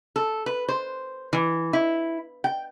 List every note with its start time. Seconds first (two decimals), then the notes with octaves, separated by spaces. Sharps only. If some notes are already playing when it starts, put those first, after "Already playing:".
0.16 A4
0.46 B4
0.69 C5
1.33 E3
1.73 E4
2.44 G5